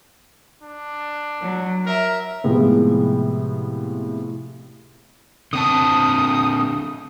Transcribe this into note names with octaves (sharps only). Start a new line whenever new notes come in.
D4
F#3
A#4 E5
A2 C3 F3 G#3 B3
D3 C4 A5 D#6